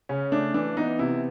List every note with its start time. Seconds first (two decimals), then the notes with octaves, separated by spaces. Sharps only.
0.09 C#3 C#4
0.32 A3 D4
0.54 E3 D4
0.77 B3 D#4
0.99 C3 E4